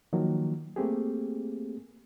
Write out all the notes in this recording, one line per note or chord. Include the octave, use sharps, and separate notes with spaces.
D#3 F3 F#3 A#3
A3 A#3 C4 G4 G#4